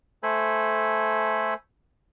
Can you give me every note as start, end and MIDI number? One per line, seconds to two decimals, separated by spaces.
0.23 1.54 57
0.23 1.54 69
0.23 1.54 72
0.23 1.54 80
0.23 1.54 83